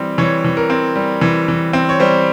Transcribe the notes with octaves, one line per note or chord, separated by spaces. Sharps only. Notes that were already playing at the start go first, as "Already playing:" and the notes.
Already playing: E3 G3 C4
E3 C#5
E3
A#4
C4
G3
E3
E3
C4
C#5
G3 C5